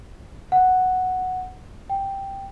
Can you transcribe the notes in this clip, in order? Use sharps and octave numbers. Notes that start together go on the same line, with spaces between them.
F#5
G5